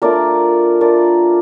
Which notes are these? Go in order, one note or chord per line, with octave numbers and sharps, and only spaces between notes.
A3 D4 F4 A#4 D5
A3 D4 F4 A#4 D5